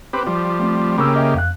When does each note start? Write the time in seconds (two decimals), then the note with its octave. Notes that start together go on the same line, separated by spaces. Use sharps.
0.13 C4 G4 B4
0.27 F3 G3
0.59 A3 C4
0.98 C#3 A#3 G4 B5 C#6 E6
1.16 D#5 E5 G5
1.34 F2 F5 F#6